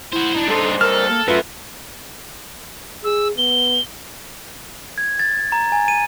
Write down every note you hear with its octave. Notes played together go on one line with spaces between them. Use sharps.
E4 F#4 C5
D4 D#4
G2 A4 C5
A4 A#4 F6
A#3
F#2 F4 A4 B4 E5
G#4 E6
B3 G7
G#6
A6
A#5
G#5
D#7